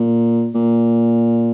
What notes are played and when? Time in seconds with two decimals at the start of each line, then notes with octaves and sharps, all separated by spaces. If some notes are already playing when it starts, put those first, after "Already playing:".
Already playing: A#2
0.55 A#2